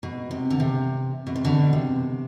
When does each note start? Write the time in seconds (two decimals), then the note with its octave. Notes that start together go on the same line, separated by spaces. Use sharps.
0.03 B2
0.31 C3
0.50 D3
0.60 C3
1.27 B2
1.36 C3
1.44 B2 D3
1.73 C3